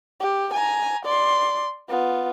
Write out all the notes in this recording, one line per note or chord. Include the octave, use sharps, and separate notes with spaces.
G4
G#5 A#5
D5 C6
B3 F4